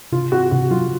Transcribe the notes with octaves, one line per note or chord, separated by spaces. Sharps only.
C3 F4
C4 F#4
C3 F#4
F#3 F4